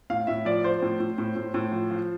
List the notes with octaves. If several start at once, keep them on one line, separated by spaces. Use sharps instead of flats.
A2 F5
A2 E5
F3 D5
F3 C5
A2
A2
A2
A2
A2
F3
F3